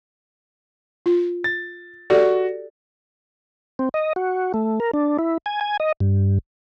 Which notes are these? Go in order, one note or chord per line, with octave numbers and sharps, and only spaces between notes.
F4
A6
F#4 G4 A4 D5
C4
D#5
F#4
A3
A#4
D4
E4
G#5
G#5
D#5
G2